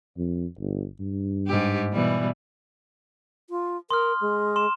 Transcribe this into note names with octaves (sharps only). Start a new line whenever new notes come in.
F2
G1
G2
G#2 G4
B2 E3 G3
F4
A#4 C6 D#6 F6
G#3
C6 E7